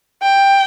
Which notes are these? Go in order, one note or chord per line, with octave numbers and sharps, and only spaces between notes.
G5